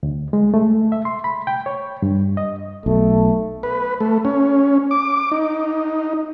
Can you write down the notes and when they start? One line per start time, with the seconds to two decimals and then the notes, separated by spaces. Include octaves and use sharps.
0.03 D2
0.33 G#3
0.54 A3
0.92 E5
1.05 C6
1.24 B5
1.47 G5
1.66 C#5
2.02 G2
2.37 D#5
2.86 B1 A3
3.63 B4
4.01 A3
4.25 C#4
4.91 D6
5.31 D#4